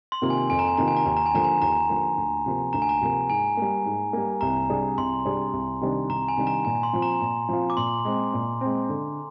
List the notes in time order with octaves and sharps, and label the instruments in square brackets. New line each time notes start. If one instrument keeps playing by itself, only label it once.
[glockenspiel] C6
[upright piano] C3 D#3 A#3 F4
[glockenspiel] G#5
[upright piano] F2 [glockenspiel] G#5
[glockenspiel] A#5
G#5
[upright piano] C3 D#3 A#3 F4 [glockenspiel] A#5
[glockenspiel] G#5
A#5
[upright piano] D#2 [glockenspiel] G#5
[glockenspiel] A#5
G#5
[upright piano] D3 F3 A#3 [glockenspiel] A#5
[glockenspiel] G#5
[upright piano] D#2 [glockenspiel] A#5
[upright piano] D3 F3 A#3
D2
C3 F3 A#3
[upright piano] D2 [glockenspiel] A#5
[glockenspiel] G#5
A#5
[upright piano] C3 F3 A#3
[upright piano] G#2 [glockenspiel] G#5
[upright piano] G3 A#3
G#2
G3 A#3
[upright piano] C2 [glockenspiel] A#5
[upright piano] C3 G3 D4 G#4
[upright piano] C2 [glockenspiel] C6
[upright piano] C3 G3 D4 G#4
C2
C3 D#3 G3 D4
[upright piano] C2 [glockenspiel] A#5
[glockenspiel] G#5
[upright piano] C3 D#3 G3 D4
[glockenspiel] A#5
[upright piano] A#2 [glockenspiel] G#5
[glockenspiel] C6
[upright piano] F3 C4 F4
[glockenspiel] A#5
[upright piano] A#2
F3 C4 F4
[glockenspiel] D6
[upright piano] A#2 [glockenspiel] C6
[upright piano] G#3 C4
A#2
G#3 C4
D3